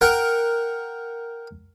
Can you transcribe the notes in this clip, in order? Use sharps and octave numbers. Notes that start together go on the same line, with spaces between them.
A#4 F#5 G5